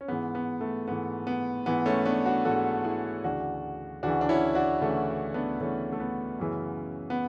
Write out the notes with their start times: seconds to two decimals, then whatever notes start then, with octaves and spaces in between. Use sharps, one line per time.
0.01 C#4
0.08 G#2 E3 B3
0.35 B3
0.61 A3
0.88 G#2 E3 B3
1.27 B3
1.66 G#2 E3 B3
1.86 A3 C#4
2.05 B3 D4
2.26 D4 F#4
2.45 G#2 E3 F#4 A4
2.84 E4 G#4
3.24 D2 C#3 E3 D4 F#4
4.03 D2 C#3 E3 D4 F#4
4.21 D4
4.29 C#4 E4
4.55 D4 F#4
4.81 D2 C#3 E3 A3 C#4
5.34 B3 D4
5.60 D2 C#3 E3 A3 C#4
5.92 A3
6.00 B3
6.39 F#2 C#3 E3
7.10 B3